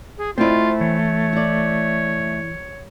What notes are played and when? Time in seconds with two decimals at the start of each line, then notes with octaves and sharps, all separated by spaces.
0.18 G#4
0.38 A3 C4 E4 F4 C5 D5 D#5
0.81 E3 C#5
1.33 E4 D5